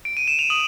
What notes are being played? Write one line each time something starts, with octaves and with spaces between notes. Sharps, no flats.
D7
D#7
E7
F7
D#6 F#7